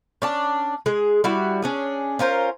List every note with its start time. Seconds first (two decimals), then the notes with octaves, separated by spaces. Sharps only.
0.22 C#4 D4 A5
0.86 G#3 G#4
1.24 G3 E4 F#4
1.62 C#4 D4 G#4
2.19 C#4 F4 A#4 C5